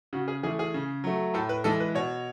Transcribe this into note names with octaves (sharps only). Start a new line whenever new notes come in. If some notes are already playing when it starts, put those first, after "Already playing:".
C#3 F#4
G#4
E3 A3 G#4
G#4
C#3
F#3 A3
A2 A4
B4
E3 G#3 A4
B4
B2 C#5